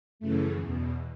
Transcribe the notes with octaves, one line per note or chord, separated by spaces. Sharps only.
F#2 C#3 E3 A3
E2 B2